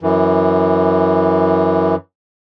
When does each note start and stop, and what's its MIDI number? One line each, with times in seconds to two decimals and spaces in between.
0.01 1.95 42
0.01 1.95 52